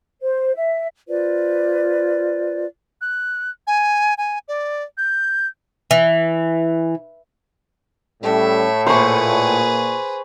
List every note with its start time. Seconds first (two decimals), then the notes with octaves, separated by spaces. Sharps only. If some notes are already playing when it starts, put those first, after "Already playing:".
0.22 C5
0.55 E5
1.08 F4 B4 C5 D5
3.01 F#6
3.67 G#5
4.18 G#5
4.48 D5
4.98 G6
5.91 E3
8.23 A2 G3 C#4 A4 E5
8.87 A#2 G#4 B4 C5 C#6